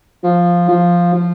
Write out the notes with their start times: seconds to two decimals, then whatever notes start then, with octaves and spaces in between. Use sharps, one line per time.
0.23 F3
0.68 F3
1.13 F3